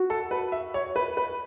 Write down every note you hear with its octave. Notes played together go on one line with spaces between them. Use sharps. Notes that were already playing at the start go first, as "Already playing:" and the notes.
Already playing: F#4
A4
B4
E5
C#5
B4
B4